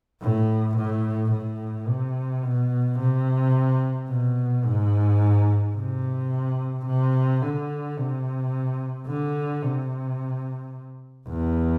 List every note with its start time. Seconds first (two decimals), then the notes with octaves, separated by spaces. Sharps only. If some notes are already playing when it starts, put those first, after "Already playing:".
0.22 A2
0.77 A2
1.32 A2
1.88 C3
2.43 B2
2.99 C3
4.09 B2
4.65 G#2
5.76 C3
6.86 C3
7.42 D3
7.97 C3
9.07 D3
9.63 C3
11.29 E2